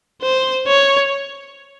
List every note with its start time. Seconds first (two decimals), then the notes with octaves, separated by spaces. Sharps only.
0.22 C5
0.67 C#5